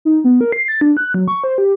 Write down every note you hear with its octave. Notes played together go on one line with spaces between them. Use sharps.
D#4
B3
A#4
C7
A6
D4
F#6
F#3
C#6
C5
G4